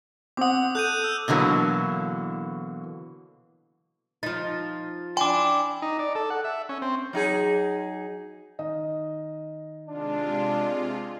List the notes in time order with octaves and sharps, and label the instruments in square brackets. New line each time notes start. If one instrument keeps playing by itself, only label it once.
[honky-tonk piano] C4 F#5 [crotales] D6 D#6
[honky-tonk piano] A4 [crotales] F#6 G6 D#7
[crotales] E6
[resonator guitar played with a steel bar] B2 D3 E3 F#3 A#3
[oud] F3 D#4 [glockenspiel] A6
[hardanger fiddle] D4 E4 [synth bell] G5 G#5 [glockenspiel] C6 D6
[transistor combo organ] D#4
D5
A4
F#5
E5
C#4
C4
[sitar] F#3 D#4 G#4
[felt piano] D#3 D#5
[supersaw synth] C3 G#3 F4 [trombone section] D4